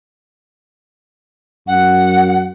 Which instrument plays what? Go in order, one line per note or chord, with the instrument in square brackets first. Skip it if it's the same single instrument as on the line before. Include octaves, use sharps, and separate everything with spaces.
[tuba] F#2 [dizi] F#5